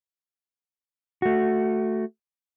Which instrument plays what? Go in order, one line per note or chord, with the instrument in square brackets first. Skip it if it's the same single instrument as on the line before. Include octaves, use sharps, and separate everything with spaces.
[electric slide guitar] A3 F#4